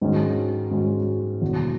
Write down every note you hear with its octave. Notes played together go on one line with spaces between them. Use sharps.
G#2 D#3 G#3 C#4 F#4
G#2 D#3 G#3 C#4 F#4
E1 E2 B2